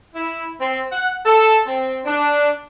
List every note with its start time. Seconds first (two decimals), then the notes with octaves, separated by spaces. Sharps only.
0.15 E4
0.61 C4
0.92 F#5
1.26 A4
1.67 C4
2.05 D4